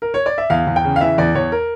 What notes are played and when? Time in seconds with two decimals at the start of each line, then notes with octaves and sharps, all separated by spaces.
0.02 A#4
0.14 C#5
0.26 D5
0.38 E5
0.50 E2 F5
0.67 E2
0.76 G5
0.84 C#3
0.96 F5
1.01 E3 E5
1.18 E2 D5
1.35 E2 C#5
1.52 A#4